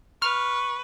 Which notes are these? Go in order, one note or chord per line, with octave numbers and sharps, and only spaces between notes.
B4 C#6 F6